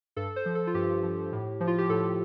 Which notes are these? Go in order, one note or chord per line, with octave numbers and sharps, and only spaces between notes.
G2 A4
C5
F3
A4
F4
G2 G4
F3
A2
F3
F4
G4
A2 A4